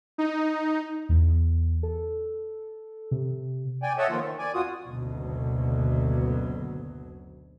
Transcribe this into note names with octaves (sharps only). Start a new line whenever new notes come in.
D#4
E2
A4
C3
D5 G5 G#5
A4 C#5 D#5 E5 F#5 A5
D#3 F3 A3 A#3 F4
D#3
D5 G#5
F2 F4 F#4 D#6
F#1 D2 B2 F#3